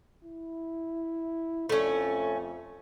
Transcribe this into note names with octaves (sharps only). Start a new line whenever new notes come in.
E4
F2 A3 C#4